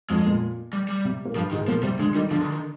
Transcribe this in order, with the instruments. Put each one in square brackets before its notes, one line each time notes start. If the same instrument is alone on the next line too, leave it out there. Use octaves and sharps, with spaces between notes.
[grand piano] F2 F3 [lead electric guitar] G#3
[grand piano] A#2
[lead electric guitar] G3
G3
[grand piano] C3
A#2 A#3
[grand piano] G2 G3 [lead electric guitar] F3
[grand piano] G#2 G#3 [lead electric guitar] D#3
[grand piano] A#2 A#3 [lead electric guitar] F3
[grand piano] C3 C4 [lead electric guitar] G3
[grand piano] D3 D4 [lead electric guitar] G#3
[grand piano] D#3 D#4 [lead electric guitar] G3
[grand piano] D3 D4 [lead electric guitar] F3
[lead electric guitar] D#3
D#3